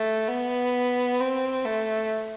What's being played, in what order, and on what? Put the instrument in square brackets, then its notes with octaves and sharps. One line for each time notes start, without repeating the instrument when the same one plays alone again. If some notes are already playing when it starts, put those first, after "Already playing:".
Already playing: [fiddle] A3
B3
C4
A3